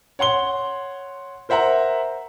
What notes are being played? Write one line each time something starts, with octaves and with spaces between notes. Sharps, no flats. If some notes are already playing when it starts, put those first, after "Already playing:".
C#5 F#5 C6 G7
A#4 C5 E5 F#5 A#5